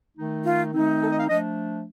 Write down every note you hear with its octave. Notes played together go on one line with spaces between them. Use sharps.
D#3 A3 D#4
F4
D#3 A3 C4 D#4
A4
D#5
F5
F3 A3 D4 D#5